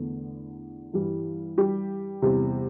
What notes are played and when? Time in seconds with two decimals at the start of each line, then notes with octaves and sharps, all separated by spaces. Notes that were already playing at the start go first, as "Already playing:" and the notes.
Already playing: E2 D3 A3 B3
0.94 G2 E3 G3
1.58 G3 G4
2.22 E2 C3 G3